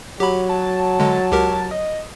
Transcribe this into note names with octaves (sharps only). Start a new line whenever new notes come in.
F#3 G4 B5
A5
D3 G#3 A5
C#2 G4 A#4
D#5